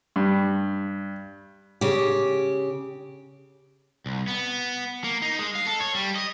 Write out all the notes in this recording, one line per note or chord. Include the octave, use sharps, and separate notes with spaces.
G2
C#3 G4
C2
B3
A#3
D#4
G#3
F5
A4
C#5
G3
D#5